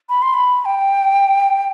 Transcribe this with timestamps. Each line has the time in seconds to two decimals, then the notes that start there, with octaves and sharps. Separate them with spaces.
0.09 B5
0.22 C6
0.34 B5
0.65 G5